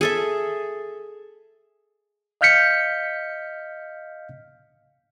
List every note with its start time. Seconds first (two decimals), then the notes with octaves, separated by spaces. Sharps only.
0.01 G#4 A4 E5
2.41 D#5 F5 F6 G6 B6 C#7